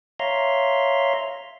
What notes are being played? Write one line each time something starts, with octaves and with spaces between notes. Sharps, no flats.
C#5 E5 F5 A#5 C6